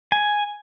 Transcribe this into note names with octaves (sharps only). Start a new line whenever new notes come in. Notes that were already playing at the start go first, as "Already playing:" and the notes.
G#5